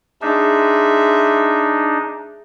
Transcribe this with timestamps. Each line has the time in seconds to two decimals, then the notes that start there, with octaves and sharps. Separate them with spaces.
0.22 G#3 D4 D#4 E5